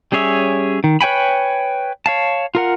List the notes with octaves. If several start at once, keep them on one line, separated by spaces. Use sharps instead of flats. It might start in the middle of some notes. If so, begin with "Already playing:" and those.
G3 C#4 G#4 C#5 E5
D#3
B4 C#5 G5 G#5 B5
C#5 F5 A5
F4 A#4 F#5